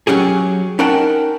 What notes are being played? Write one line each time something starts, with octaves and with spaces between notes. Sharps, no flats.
F#3 C#4 G4 G#4
C#4 D#4 A#4 F#5 G5 A5